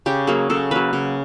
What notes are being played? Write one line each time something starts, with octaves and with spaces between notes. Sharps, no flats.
C#3 G4
F#3 A#3 G#4
C#3 A4
F#3 A#3 B4
C#3